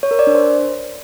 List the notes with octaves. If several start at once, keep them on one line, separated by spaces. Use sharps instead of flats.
C#5
A#4
D5
D4
C5